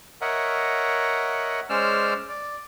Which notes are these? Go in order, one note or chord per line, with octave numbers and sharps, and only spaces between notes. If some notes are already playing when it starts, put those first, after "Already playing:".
A#4 C#5 D#5 E5 F#5
G#3 C#4 C5 D5 E6 F6
D5